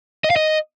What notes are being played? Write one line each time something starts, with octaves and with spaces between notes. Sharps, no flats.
D#5
F5
D#5